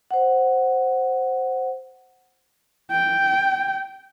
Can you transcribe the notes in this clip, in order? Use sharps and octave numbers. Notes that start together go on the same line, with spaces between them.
C5 F#5
G5